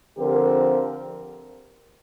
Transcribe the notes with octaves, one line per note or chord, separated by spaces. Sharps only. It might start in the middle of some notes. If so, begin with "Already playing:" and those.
D3 F3 C4 G4 A#4